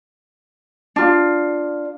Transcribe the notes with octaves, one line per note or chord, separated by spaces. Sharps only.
D4 F4